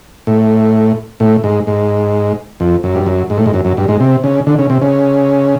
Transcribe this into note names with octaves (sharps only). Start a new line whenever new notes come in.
A2
A2
G#2
G#2
F2
F#2
G2
F#2
G#2
A2
G#2
F#2
F#2
G2
G#2
C3
C#3
D3
C#3
C3
C#3